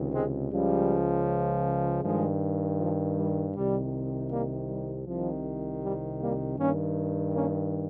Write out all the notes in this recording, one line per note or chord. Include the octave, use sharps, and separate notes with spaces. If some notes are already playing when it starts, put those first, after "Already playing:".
Already playing: C#2 C3 D#3
G#3 C4
C#2 C#3 F3 G3
G2 D#3 F3 G#3
F3
G3
C2 C3 D#3 G3
G3 A#3
G3
C2 C3 D#3 F3
G3
G3 A#3
G2 D#3 A#3 C#4
A#3 C#4